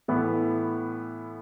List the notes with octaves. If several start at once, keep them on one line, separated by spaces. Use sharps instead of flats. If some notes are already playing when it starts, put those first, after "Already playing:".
A2 E3 B3